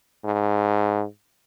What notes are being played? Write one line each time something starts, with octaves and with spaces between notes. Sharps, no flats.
G#2